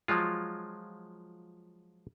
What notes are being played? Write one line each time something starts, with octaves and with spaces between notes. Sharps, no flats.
F3 F#3 G#3 F4